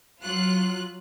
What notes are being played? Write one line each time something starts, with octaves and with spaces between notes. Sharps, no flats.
F#3 F4 F#6